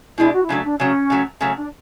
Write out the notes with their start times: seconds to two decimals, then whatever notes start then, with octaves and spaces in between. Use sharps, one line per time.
0.18 B2 G#3 D4 E4
0.33 F#4
0.45 E4
0.48 C#3 F#3 A3 D4
0.64 D4
0.79 C#3 F#3 A3 C#4
1.10 C#3 F#3 A3
1.40 C#3 F#3 A3 C#4
1.56 D4